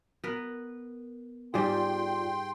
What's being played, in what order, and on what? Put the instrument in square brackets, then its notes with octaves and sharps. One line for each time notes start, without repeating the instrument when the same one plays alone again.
[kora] B3 A#4 B4
[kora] G#2 G3 G#4 [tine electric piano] F4 D5 [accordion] G5 C6